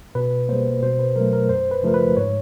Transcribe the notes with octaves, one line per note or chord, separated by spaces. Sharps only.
B2 B4
G3 A#3 C5
B2 C5
B4
F#3 A3 A#4
A#4
F#2 C5
B4
C#3 F3 A3 A#4
B4
G#2 C#5